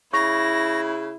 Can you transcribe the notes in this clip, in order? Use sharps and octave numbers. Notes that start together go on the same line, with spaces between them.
C#3 E4 C#6 A#6